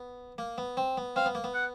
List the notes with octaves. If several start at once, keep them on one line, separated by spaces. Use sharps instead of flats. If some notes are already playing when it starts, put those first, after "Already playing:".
Already playing: B3
A#3
B3
C4
B3
C4 F5
B3
A#3
B3
F#5